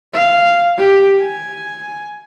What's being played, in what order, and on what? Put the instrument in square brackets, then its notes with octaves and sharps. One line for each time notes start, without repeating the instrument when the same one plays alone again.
[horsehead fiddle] F5
G4
G#5